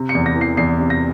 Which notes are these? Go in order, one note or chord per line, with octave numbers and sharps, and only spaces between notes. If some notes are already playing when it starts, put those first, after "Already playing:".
Already playing: C3
C#7
E2
A#6
E3
C7
E2 C7
C3
A#6